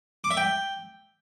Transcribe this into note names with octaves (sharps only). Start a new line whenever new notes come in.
D6
E5
G5